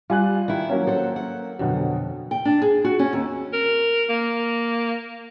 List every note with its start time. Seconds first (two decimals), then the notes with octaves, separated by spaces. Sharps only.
0.10 G3 F4 G#5 F#6
0.48 D#3 E4
0.69 F#3 A#3 C#4
0.87 A4 C5 F#5
1.16 F#5
1.59 F2 B2 D3 F#3
2.31 G5
2.45 D4
2.62 G#4
2.85 F#4
2.99 C#4
3.13 D#2
3.53 A#4
4.09 A#3